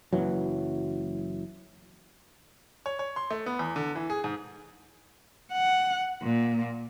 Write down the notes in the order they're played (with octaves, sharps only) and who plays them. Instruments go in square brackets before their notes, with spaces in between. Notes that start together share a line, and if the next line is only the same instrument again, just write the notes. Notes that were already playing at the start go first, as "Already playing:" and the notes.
[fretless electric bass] F#1 B1 E3 F#3
[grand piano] C#5
C#5
C6
A3
B3
E2
D3
E3
G#4
G#2
[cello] F#5
A#2